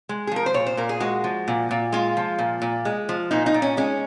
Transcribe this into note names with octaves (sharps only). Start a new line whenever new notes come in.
G#3
G#4
F3 A#4
C5
A#2 C#5
C5
A#2 A#4
G#4
G#3 F#4
F3
A#2
A#2
G#3 F4
F3
A#2
A#2
G#3
F3
A#2 D#4
D#4
A#2
C#4
G#3 C#4